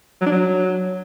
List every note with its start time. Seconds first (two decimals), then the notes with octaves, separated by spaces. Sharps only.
0.21 F#3
0.26 D4
0.31 F#3